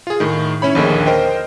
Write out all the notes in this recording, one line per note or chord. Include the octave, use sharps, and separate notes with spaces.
F4 G#4
A2 D#3
C#4 E4 C#5 B5
A#1 D#2 D3 A#3 G#4 D#5
A#4 C5 D#5 G5